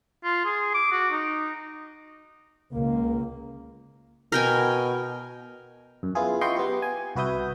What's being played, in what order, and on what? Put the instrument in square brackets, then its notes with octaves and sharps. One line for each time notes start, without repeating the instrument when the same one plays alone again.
[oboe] F4
G#4
D6
F#4
D#4
[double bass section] C#2 [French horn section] A#3
[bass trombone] B2 [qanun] A#4 G5 G#5
[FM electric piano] F#2
B3 E4 F4 G#4
E4 F4 D#5 G5 C6 C#6
B3 G4
G#5
C2 F#4 B4 E5 D#6 G6